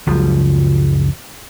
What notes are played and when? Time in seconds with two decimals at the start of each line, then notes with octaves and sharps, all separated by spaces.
0.07 F#1 C#2 F3